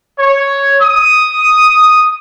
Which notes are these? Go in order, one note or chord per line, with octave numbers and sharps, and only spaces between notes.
C#5
D#6